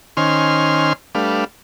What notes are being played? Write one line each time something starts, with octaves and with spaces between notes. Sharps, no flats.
D#3 C#4 C5 G#5 C6 F6
G3 A3 D4 B4 F5